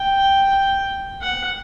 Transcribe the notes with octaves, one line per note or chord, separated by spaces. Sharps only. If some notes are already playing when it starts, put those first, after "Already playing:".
Already playing: G5
F#5